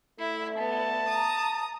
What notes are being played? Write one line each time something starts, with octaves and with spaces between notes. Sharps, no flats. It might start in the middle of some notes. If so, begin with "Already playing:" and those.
A3 E4
B3 A5
A#5 D#6